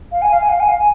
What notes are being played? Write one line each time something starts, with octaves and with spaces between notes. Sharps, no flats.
F5
G#5
F5
G#5
F5
G#5
F5
G#5